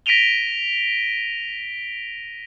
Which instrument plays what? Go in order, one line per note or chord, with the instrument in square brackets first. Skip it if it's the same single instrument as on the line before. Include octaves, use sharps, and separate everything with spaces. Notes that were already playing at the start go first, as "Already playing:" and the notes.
[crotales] A#6 B6 D7 D#7 F7 G7